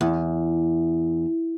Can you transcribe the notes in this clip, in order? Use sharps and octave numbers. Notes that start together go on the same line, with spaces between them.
E2